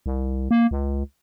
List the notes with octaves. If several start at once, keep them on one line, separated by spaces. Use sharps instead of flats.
C2
A#3
C#2